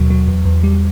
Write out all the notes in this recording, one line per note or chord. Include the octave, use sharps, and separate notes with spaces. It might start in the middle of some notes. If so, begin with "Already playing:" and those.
Already playing: D#2 B2 F#3
F#3
E2
E2
G3